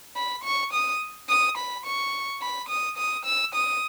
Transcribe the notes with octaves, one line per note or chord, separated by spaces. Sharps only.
B5
C#6
D#6
D#6
B5
C#6
B5
D#6
D#6
E6
D#6